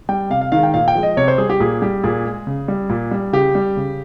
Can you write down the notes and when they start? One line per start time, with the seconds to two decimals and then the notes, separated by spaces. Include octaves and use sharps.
0.09 G3 G5
0.30 C3 F5
0.41 F5
0.52 D#3 G#3 F5
0.63 G5
0.74 A#2 F5
0.88 G5
0.95 F3 G#3
1.03 D#5
1.17 C3 C#5
1.28 C5
1.38 G3 G#4
1.50 G4
1.60 A#2 G#4
1.82 G3 G4
2.04 A#2 G#4
2.25 G#3
2.47 C#3
2.68 G3
2.89 A#2
3.11 G3
3.33 C#3 G4
3.55 G3
3.77 C#3